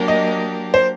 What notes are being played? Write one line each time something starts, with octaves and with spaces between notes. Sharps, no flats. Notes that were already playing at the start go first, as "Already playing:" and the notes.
Already playing: F#3 A#3 D4 G4 A#4
D#5
C5